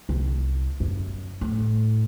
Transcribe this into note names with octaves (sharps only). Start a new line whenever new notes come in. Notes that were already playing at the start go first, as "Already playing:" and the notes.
C2
F#2
A2